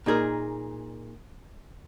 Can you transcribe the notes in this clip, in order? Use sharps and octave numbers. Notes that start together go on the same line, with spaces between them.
A#2 D#4 G#4 A#4